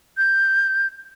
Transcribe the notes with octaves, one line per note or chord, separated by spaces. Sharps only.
G6